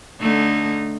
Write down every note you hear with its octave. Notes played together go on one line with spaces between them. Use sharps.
D3 A3 D#4